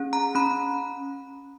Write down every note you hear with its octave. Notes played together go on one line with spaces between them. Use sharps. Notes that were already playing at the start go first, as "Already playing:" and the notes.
Already playing: C#4 G#4
A#5
C#4 B5